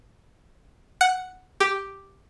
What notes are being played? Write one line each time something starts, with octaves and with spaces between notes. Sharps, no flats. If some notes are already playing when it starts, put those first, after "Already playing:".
F#5
G4